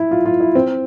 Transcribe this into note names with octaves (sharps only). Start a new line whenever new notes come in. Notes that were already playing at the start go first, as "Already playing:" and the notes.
Already playing: E4
F4
F4
E4
C4